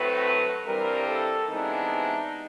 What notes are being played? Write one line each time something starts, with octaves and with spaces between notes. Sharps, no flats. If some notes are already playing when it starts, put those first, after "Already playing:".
Already playing: A2 F#3 A3 C4 B4
G2 E3 G3 C4 A#4
A4
C3 E3 G#3 B3 D4 D#4